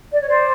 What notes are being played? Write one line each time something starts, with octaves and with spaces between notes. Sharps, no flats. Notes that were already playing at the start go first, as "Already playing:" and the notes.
D5
C#5
C5 D5